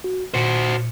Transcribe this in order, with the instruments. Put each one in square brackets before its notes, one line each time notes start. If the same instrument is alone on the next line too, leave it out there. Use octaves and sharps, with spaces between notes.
[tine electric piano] F#4
[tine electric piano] A#2 C#7 [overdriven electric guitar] F#4 C5